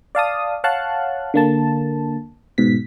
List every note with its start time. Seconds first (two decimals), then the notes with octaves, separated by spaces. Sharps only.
0.15 D5 F5 A5 D#6
0.64 C#5 F5 F#5 A5 F#6
1.34 D3 A#3 A5
2.58 G#2 B2 B6